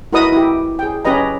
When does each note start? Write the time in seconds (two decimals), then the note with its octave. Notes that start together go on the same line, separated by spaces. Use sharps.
0.13 E4 F#4 A#4 B4 D#5 D#6
0.32 E4 G4
0.79 G#4 G5
1.05 C#4 G4 B4 D#5 A#5